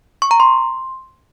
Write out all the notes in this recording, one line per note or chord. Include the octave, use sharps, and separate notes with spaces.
C#6
A#5
C6